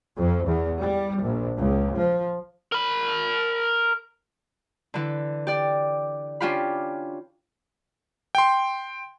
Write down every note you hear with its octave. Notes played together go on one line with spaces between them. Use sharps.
F2
E2
G3
A#1
C#2
F3
A#4 B5
D3 E3
G4 D5
C#4 D4 F4 G4 F5 B5
G5 C6